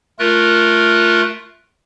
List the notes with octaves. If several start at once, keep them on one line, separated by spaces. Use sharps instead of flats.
A3 F4 A#4 F#6